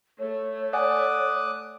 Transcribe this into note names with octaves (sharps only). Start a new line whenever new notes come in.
A3 C#5
D5 F#5 G#5 D6 D#6 F#6